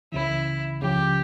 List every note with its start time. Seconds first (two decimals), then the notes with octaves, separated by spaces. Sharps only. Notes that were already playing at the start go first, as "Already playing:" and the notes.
0.12 C#2 C#3 E3 E4
0.81 C#2 C#3 F3 G4